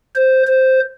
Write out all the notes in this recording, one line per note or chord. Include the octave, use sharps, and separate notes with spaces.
C5
C5